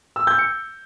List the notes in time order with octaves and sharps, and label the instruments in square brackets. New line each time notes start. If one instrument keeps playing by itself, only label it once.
[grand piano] E6
G6
C#7